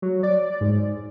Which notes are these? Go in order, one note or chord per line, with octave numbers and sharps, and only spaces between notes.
F#3
D5
G#2